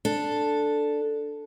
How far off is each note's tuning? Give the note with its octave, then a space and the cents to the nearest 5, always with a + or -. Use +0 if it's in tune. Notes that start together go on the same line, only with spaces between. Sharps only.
D4 +0 A4 +0